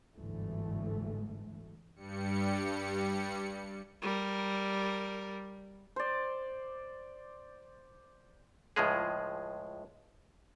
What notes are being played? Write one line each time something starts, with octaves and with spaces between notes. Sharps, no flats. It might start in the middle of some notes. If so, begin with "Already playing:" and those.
G1 D2 G#2 E3 A3
G2 G3 C#7
G3 A#4
C5 D5
C#2 A2 F3 G#3 G#4